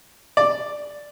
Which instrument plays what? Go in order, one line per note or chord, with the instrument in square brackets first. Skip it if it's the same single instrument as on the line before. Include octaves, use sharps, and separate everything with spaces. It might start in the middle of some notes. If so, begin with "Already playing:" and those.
[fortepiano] D5